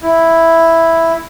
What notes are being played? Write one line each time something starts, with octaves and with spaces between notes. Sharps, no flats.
E4